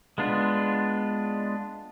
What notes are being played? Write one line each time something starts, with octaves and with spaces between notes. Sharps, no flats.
G#3 B3 D4 F4